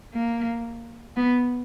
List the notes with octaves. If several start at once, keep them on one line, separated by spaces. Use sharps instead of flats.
A#3
B3